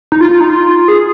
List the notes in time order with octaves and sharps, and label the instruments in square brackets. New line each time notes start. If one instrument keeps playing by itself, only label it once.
[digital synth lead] D#4
F4
F4
D#4
F4
G#4